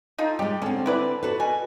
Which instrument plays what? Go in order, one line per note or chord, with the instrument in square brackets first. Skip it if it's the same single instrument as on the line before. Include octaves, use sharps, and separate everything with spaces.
[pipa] D#4 F4 A4
[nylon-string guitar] G3 G#3 [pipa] G4
[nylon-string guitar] D3 C4 [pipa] C#4
[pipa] E4 B4 D5
[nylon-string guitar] F#4 A4 B4
[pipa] B2 G#5